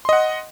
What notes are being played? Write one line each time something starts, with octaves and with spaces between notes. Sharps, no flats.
D#5 F#5 C6